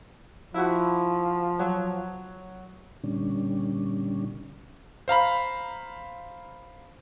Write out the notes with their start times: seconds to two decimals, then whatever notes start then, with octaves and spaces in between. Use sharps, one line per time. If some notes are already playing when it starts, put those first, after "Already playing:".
0.55 F3 E4 F#4
1.60 F#3
3.04 A#2 D3 G3 C#4 D4
5.08 C5 F5 A#5 B5